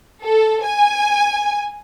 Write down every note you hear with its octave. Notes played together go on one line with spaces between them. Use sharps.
A4
G#5